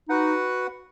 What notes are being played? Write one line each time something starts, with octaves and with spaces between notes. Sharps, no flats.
D#4 F#4 B4 F#5